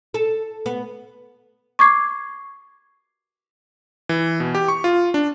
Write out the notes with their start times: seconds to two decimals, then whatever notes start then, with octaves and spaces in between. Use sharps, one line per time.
0.14 A4
0.66 B3
1.79 C#6 D6 G#6 C7
4.09 E3
4.40 B2
4.55 G4
4.68 C#6
4.84 F4
5.14 D4